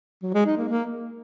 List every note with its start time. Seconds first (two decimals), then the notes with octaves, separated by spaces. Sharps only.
0.23 F#3
0.34 G#3
0.46 D#4
0.58 A#3
0.69 A#3